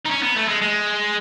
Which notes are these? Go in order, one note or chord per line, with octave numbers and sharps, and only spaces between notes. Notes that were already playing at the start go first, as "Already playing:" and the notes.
D#4
C#4
B3
A3
G#3
G#3